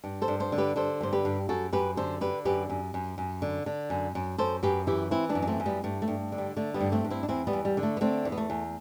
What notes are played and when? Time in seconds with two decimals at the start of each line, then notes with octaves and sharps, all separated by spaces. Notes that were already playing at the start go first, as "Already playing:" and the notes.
0.04 G2
0.22 A4 C5
0.28 G2
0.40 A4 C5
0.52 D3
0.58 G4 B4
0.76 D3 A4 C5
1.01 G2 C5
1.13 G4 B4
1.25 G2
1.49 F#2 F#4 A4
1.73 F#2 G4 B4
1.97 D3 A4 C5
2.21 D3 G4 B4
2.45 F#2 G4 B4
2.70 F#2
2.94 F#2
3.18 F#2
3.42 D3
3.66 D3
3.90 F#2
4.15 F#2
4.38 F#2 A4 C5
4.63 F#2 G4 B4
4.87 E3 E4 G4
5.11 E3 C4 E4
5.29 B3 D4
5.35 F#2
5.42 D4
5.47 A3 C4
5.60 F#2
5.66 G3 B3
5.84 G2 A3
6.02 A3
6.08 G2
6.32 D3
6.38 G3
6.57 D3 A3
6.74 G3 B3
6.80 G2
6.92 A3 C4
7.04 G2
7.10 C4 E4
7.23 D4
7.28 E2 C4 E4
7.47 G3 B3
7.53 E2
7.65 G3
7.77 D3
7.83 A3
7.97 B3
8.01 D3 A3 C4
8.25 E2
8.32 B3
8.38 A3
8.50 E2